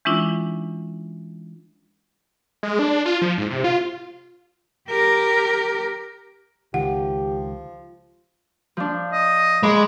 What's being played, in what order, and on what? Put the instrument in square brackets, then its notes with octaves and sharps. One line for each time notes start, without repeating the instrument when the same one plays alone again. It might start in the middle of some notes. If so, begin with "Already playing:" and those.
[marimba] E3 G#3 C#4 D4 E4 F4
[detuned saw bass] G#3
D4
F4
F3
G#2
C3
F4
[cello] G4 A#4
[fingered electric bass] C#2 D#3 [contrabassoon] F3 [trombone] G4 [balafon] F#5
[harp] F3 D4
[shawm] D#5
[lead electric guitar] G#3 [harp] B5 D6